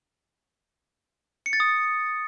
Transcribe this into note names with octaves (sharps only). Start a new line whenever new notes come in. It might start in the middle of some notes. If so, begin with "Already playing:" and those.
C#7
A6
D#6